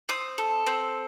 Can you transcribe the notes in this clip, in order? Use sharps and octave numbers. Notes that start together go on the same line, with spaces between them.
C4 D#6
A4
C4